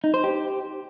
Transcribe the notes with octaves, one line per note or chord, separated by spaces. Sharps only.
D#4
C5
G4